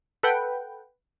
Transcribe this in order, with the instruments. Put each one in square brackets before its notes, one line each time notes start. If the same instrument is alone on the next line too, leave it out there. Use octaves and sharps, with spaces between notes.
[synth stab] A4 B4 F#5 G5